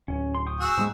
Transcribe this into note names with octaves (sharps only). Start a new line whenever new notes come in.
D1 C#4
C6
G5 C#6 D#6
F#4 G#4 E6
G#2 G3 G#3